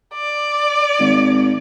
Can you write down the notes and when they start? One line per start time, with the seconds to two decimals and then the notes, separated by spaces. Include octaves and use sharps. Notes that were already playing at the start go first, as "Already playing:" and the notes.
0.14 D5
0.99 G#1